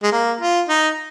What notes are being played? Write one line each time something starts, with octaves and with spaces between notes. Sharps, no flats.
G#3
A#3
F4
D#4